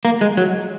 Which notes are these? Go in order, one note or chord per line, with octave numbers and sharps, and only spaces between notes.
A#3
G#3
F#3